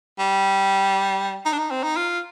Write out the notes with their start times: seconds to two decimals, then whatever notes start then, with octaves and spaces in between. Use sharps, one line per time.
0.19 G3
1.45 D#4
1.53 D4
1.58 D#4
1.71 C4
1.83 D#4
1.96 F4